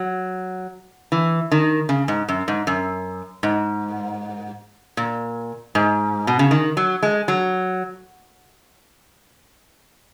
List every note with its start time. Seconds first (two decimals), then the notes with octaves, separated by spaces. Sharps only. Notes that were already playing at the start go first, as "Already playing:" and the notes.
Already playing: F#3
1.12 E3
1.52 D#3
1.89 C#3
2.08 G#2
2.29 F#2
2.48 G#2
2.67 F#2
3.43 G#2
4.97 A#2
5.75 G#2
6.27 B2
6.39 C#3
6.51 D#3
6.77 F#3
7.03 G#3
7.28 F#3